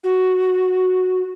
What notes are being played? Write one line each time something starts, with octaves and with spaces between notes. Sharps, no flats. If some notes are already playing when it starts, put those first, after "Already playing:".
F#4